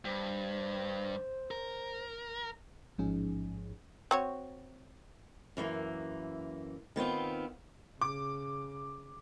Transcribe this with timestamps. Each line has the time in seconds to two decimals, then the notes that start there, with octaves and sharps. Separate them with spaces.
0.05 G2 C5
1.51 A#4
2.98 A1 G#2 F3 C#4 D#4 G#4
4.11 C4 F#4 C#5
5.57 F#2 E3 G#3 A#3
6.96 D#3 B3 C4 F4
8.01 C#3 D6